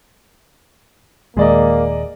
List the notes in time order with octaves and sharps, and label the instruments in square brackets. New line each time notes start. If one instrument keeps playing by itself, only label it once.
[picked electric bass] D#1 D#2 G#3 [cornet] A#3 [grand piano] G#4 D5 D#5